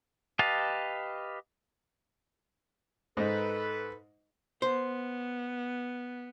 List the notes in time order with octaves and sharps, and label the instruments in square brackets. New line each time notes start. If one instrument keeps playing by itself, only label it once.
[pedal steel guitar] G4 B4 D#5 F5 A5
[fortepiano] G#2 D#4 [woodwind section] A4 B4
[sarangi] B3 [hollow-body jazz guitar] C5